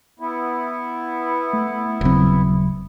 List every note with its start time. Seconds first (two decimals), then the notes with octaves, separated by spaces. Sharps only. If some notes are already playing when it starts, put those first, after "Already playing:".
0.19 B3 E4
1.53 A3
2.01 D#1 C#3 F#3 C4